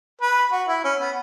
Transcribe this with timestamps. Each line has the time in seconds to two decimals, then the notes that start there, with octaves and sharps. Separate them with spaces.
0.21 B4
0.52 F#4
0.69 E4
0.84 C#4
1.01 B3